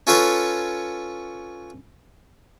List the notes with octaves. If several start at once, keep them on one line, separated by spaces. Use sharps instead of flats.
C#4 F4 A4 B4 C#5